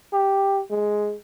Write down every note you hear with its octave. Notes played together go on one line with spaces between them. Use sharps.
G4
G#3